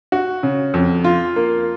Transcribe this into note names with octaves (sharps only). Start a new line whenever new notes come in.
F#4
C#3
F2
F4
A#3